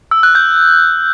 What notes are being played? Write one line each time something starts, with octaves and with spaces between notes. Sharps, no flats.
E6
F#6
G6